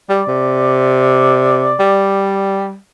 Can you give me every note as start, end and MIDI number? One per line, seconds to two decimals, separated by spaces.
0.09 0.22 55
0.09 2.38 74
0.28 1.74 48
1.79 2.77 55